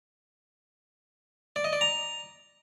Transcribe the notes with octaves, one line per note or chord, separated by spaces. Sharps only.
D5
D#5
D5
A#5